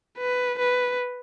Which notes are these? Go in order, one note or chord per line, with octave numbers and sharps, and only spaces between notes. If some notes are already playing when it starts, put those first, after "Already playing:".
B4
B4